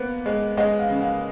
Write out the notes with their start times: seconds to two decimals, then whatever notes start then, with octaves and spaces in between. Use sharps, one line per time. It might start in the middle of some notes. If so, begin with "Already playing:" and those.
Already playing: A#3 B3
0.26 G#3
0.57 G#3 D#5
0.79 F5
0.90 C#3
1.01 F5